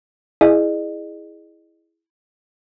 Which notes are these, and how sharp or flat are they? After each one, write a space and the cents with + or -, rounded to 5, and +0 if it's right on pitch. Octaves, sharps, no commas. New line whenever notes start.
E4 +0 G#4 +0 D#5 -35